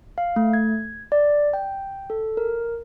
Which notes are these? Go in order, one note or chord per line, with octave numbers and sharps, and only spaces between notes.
F5
A3
G#6
D5
G5
A4
A#4